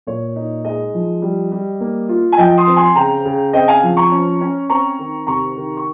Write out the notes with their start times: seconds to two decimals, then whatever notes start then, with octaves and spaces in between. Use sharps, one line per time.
0.07 A#2 C#5
0.36 D#4
0.65 G#3 D#5
0.94 F3
1.22 G3
1.52 G3
1.81 A#3
2.09 F4
2.32 G#5
2.38 F3 D#5 G5
2.58 C6 D#6
2.67 C4
2.76 G#5 C6
2.96 C#3 G5 A#5
3.25 C#3
3.53 C4 D#5 G5
3.68 F5 G#5
3.83 F3
3.97 A#5 C#6
4.12 C#4
4.41 C#4
4.70 C4 A#5 C#6
4.99 D#3
5.27 C3 A#5 C#6
5.56 D#3
5.77 C#6